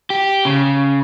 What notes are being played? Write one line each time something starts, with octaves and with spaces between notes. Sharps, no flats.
G4
C#3